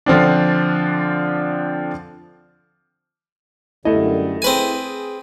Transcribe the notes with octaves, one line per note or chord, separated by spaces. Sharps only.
D3 F3 C4 D4
F#2 D3 G3 A3 E4 D#5
C4 G#4 B4 G#5